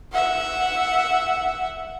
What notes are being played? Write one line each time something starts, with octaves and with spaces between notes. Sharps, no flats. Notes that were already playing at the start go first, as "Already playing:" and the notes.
E5 F#5